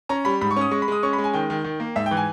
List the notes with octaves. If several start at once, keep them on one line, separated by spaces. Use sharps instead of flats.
C#4 A#5
G3 B5
G#2 B5
C#6
C#4 D#6
G#3 C#6
B5
G#3 D#6
C#4 C#6
B5
G#3
G#5
D#3 G5
D#3
D#3
A#3
G#2 E5
G5
E3
G#5